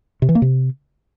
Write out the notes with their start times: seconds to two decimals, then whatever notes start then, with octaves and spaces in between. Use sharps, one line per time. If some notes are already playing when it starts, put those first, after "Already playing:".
0.22 C3
0.29 E3
0.35 A#3
0.42 C3